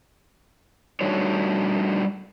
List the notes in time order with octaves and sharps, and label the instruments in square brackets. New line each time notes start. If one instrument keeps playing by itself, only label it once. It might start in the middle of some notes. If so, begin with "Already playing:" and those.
[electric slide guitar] G3 A3 D4 D#4 F#4 C#5